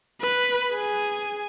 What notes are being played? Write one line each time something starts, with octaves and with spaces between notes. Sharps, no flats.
B4
G#4 G#5